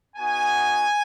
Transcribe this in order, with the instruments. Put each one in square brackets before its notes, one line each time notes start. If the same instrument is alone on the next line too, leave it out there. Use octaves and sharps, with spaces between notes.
[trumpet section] B3 D#4 F#4 G#5